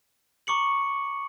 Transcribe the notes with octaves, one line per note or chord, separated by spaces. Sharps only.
A#5 C#6 D6 C#7 F#7